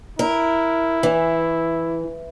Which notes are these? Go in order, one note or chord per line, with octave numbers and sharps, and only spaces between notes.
E4 A#4
E3